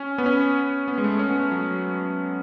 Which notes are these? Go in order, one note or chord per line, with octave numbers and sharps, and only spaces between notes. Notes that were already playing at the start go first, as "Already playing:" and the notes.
Already playing: C#4
B3
C#4
B3
G#3
A3
C#4
B3
A3
F#3